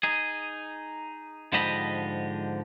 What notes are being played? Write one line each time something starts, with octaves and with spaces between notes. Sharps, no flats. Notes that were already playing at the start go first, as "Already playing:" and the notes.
D#4 G#4
G#2 D3 F3 G4 D#5 B5